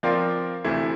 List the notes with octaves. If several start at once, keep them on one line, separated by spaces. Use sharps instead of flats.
F3 C4 F4 A#4 D5
D2 C3 E3 A3 E4